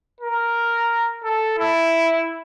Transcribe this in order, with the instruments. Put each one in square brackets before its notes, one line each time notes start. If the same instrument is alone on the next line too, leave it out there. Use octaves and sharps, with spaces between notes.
[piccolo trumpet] A#4
A4
E4